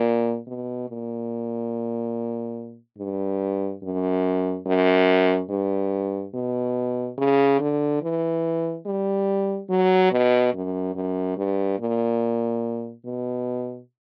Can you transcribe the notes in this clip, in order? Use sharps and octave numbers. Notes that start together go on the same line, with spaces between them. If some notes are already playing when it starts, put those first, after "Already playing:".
Already playing: A#2
B2
A#2
G2
F#2
F#2
G2
B2
C#3
D3
E3
G3
F#3
B2
F#2
F#2
G2
A#2
B2